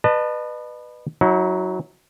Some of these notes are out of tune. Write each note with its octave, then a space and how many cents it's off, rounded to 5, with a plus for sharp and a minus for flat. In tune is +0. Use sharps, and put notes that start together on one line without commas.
B4 +0 D#5 -40 A5 +15
F#3 +0 E4 -45